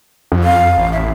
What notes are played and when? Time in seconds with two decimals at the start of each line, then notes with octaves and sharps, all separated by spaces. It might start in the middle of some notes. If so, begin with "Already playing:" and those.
0.32 F2
0.44 F5
0.77 A1
0.92 E5